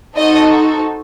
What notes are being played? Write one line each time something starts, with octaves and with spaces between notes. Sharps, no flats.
C4 D#4 F#4 A4 D#5